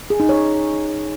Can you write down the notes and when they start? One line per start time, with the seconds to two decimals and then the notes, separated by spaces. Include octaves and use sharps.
0.10 G#4
0.20 D#4
0.29 C#5